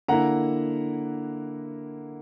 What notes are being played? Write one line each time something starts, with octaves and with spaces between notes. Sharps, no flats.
D3 A#3 E4 F#5 A#5